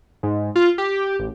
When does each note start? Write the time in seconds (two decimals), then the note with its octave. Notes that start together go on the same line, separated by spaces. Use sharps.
0.23 G#2
0.56 F4
0.78 G4
1.19 A1